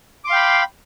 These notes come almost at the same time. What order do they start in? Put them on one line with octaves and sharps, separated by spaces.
D6 C6 F5 G5 B5